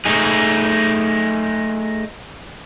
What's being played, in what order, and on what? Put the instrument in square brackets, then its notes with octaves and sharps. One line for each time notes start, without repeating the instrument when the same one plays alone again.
[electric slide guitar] A3 D#4 G#4